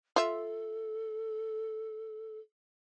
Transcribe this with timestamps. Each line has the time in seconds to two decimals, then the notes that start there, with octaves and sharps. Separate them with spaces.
0.16 F4 A4 E5